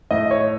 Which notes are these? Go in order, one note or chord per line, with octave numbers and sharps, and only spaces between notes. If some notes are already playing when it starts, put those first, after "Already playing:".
A2 D#5
C#5